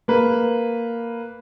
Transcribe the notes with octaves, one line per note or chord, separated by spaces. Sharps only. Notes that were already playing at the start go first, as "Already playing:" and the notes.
A#3 B4